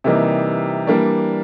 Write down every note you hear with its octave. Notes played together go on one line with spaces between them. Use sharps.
C3 E3 G3 A#3 D#4
E3 G3 A#3 D4